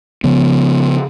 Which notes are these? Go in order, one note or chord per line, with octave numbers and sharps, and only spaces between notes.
C#3 F3 B3